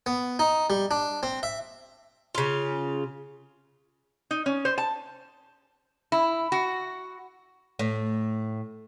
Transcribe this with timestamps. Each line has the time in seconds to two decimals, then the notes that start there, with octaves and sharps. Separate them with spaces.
0.06 B3
0.39 D#4
0.70 G3
0.91 D4
1.23 C4
1.43 E5
2.35 C#3 F4
4.31 D#4
4.46 C#4
4.65 C5
4.78 A5
6.12 E4
6.52 F#4
7.79 A2